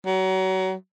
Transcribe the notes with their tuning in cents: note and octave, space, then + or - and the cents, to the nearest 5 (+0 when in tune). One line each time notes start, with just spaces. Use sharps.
F#3 +30